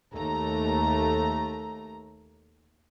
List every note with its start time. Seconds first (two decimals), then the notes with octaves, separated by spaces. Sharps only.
0.14 D#2 A3 A#5